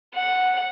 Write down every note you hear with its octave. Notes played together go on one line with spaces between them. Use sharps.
F#5